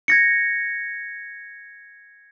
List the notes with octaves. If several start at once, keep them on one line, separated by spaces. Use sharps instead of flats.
G#6 A#6 C#7